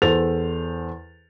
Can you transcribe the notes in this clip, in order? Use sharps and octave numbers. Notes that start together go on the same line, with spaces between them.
E2 A4 C5 A6 F7